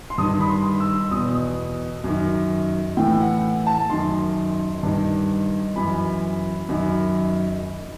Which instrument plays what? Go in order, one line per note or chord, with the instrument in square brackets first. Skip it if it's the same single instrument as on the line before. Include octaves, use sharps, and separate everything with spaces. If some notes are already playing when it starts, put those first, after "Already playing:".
[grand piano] C6
G2 D#3 D#6
B5
C6
E6
E2 B2 D#6
F#2 D#3
A2 E3 G5
F#5
A5
F#2 D#3 C6
G2 D#3
F#2 E3 B5
F#2 D#3